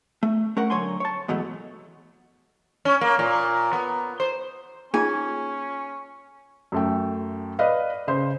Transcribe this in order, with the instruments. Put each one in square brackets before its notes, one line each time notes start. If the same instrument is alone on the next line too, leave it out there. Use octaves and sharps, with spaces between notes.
[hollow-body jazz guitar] A3
A3 C#4 A#4 F#5
D3 F#3 C#5 G#5 C6
C#5 A5
G#2 B2 E3 F#3 A3
[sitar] C#4
A#3
A#2
B3
C5
[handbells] A#3 D#4 [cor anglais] C#4 [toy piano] F4 G#4 [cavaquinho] G#5
[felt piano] F#2 A3 G5
B4 D5 D#5 F5
C#3 C5